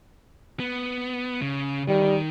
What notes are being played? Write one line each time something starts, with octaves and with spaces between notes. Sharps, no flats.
B3
C#3
D#3 G3